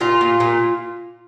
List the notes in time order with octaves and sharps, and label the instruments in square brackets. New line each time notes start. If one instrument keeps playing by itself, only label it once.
[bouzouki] A#2 F4
A#2
A#2